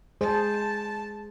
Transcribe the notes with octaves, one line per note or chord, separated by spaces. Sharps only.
G#3 G#4 C5 A5